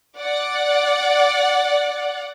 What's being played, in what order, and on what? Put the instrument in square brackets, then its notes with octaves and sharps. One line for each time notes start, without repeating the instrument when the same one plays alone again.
[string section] D5 F#5